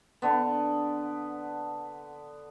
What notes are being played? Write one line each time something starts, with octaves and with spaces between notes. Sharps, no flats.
D3 B3